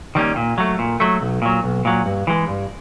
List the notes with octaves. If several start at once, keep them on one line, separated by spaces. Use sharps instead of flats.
D#3 G3 A#3 C#4
A#2
F#3 A3
A#2
F#3 A3
B1
A#2 F#3
B1
A#2 F#3
G2
E3 G#3
G2